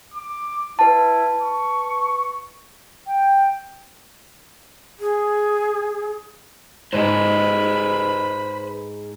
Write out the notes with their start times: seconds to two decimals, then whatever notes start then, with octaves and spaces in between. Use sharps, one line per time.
0.14 D6
0.79 E4 B4 A5
1.42 C#6
3.07 G5
4.99 G#4
6.93 G#2 G#3 G#4 B4 C5 B5